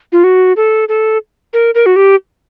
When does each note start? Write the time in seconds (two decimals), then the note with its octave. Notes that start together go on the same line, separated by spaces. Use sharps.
0.12 F4
0.24 F#4
0.57 A4
0.89 A4
1.53 A#4
1.75 A#4
1.86 F#4
1.96 G4